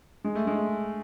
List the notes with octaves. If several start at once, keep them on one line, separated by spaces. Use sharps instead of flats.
G#3
A3
G#3